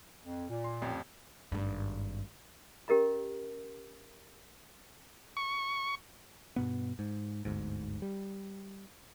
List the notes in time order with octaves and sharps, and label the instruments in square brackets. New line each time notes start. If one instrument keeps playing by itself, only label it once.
[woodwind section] F2
A#2
[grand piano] C6
A1 F2
[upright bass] G#1 G2
[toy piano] C#4 G4 A#4 D#5 A#5
[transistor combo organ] C#6
[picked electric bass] G2 B2 B3
G#2
G1 D2 G#2
G3